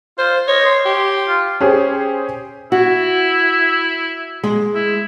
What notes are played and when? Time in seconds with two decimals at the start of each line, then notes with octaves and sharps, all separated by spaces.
0.18 F4 C5
0.48 C#5 D#5
0.66 C6
0.85 G4
1.28 F4
1.60 C#4 G4 G#4 C5
2.72 E4 F#4
4.44 G#3
4.75 E4